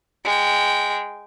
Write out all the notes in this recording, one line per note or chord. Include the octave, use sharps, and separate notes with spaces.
G#3 G5